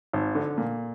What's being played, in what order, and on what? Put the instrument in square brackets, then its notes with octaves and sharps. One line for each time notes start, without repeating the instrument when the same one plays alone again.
[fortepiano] G#1
D3
A#2